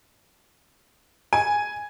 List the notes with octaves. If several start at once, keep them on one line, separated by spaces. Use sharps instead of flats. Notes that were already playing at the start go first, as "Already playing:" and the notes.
G#5